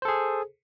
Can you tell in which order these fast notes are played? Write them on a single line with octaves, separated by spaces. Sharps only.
C5 A4 G#4